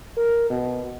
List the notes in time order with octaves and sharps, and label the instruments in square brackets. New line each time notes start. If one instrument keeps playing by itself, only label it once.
[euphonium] A#4
B2